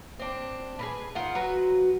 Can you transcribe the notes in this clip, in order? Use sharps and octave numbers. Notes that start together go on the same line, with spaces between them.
C4 D4
G#4 A#4 B4
D#3 F4 F#5
F#3 F#4 B4